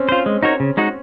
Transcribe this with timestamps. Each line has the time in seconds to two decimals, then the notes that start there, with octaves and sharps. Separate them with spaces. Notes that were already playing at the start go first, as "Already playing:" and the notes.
Already playing: C4 C#4
0.09 F4 C5
0.26 G#3
0.43 D#4 F#4 A#4 C#5
0.60 C#3
0.77 G#3 D#4 F#4